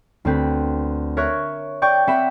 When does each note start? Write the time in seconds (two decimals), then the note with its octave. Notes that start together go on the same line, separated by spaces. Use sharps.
0.25 D2 C4 B4
1.17 A#4 C#5 E5 C#6 F#6
1.82 D5 G5 C#6 G6
2.07 C4 E5 F#5 G5 B5 E7